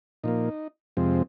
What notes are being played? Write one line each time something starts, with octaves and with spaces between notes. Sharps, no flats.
A#2 F3 A#3 D#4
F2 C3 F3 G#3 C4